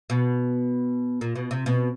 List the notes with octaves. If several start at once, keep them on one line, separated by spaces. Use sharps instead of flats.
B2
A#2
B2
C3
B2